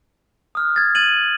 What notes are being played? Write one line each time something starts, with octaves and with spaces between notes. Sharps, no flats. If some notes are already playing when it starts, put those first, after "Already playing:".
D#6 F6 F#6
G#6 A6
G#6 A6 D#7 F#7